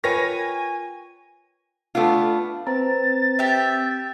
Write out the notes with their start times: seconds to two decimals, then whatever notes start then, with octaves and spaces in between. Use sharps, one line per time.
0.04 F4 A#4 B4 C#5 G5 G#5 C#6 A#6
1.95 A3 B3 D4 F4
2.67 C4 B4 C5 A#5 A6
3.39 G4 E5